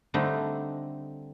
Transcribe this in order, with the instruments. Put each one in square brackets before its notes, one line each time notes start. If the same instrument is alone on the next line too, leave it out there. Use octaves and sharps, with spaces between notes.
[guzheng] D3 G3 A3 C4 D#4